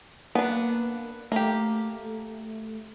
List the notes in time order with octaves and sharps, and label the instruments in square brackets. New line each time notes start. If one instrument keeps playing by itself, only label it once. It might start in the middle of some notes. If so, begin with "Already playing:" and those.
[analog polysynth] A#3 [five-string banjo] B3 D4
[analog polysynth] A3 [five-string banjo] A#3 G4